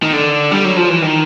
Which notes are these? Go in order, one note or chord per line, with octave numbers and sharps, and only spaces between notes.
D#3
D3
G3
F#3
F3
E3
D#3